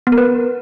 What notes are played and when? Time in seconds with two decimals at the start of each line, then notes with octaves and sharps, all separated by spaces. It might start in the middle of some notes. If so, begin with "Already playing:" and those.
0.07 B3
0.12 A#4
0.18 B4